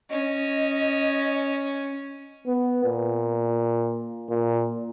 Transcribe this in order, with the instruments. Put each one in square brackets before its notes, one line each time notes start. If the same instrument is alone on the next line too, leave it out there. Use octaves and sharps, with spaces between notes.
[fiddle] C#4 [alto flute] D#5
[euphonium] B3
A#2
A#2